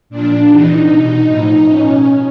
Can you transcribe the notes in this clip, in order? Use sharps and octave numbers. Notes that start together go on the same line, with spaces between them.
A#2 F3 D4
C3 E3 D#4
B2 D#4
A2 F3
B2 C#4